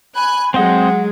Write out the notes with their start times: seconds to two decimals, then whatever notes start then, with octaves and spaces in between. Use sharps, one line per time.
0.16 G#5 B5 F#6
0.54 F#3 G#3 C4 C5 D#5 F#5